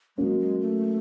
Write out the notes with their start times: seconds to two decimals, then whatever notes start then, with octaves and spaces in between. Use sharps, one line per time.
0.18 F#3 G#3 A#3 C#4
0.39 G#3
0.60 A3